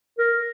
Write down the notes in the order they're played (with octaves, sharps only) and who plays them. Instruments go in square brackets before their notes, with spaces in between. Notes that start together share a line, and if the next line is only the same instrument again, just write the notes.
[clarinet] A#4